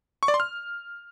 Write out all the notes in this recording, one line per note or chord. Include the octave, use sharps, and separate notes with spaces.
C#6
D5
C6
F6